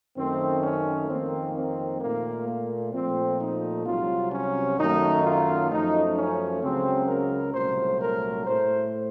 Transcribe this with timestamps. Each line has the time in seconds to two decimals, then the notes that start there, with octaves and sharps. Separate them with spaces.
0.17 F#2 D#3 A3 C4
0.63 C#4
1.09 F2 D#3 A#3 C4
1.56 C4
2.01 A#2 A3 A#3
2.47 A#3
2.93 A#2 F3 A3 C4
3.40 D#4
3.86 C2 C3 F#3 F4
4.32 C#4
4.78 F#2 D#3 F#3 A3 D#4
5.24 F4
5.70 F#2 F3 A3 D#4
6.16 C#4
6.62 C#2 C#3 F#3 C4
7.08 A#4
7.54 C2 A#2 F#3 A3 C5
8.01 A#4
8.46 A2 A3 C5